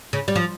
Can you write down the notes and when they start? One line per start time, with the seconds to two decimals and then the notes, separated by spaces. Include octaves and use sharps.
0.13 C#3
0.28 G3
0.36 F3